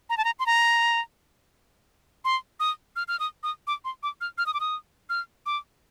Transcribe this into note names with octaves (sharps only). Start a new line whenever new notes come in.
A#5
A5
A#5
C6
A#5
C6
D#6
F6
F6
D#6
D#6
D6
C6
D6
F6
F6
D#6
D6
D#6
F6
D6